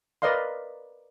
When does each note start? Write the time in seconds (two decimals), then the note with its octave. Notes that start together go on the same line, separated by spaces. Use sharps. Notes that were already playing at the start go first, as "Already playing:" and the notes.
0.22 A#4 B4 D5 D#5 F5 C6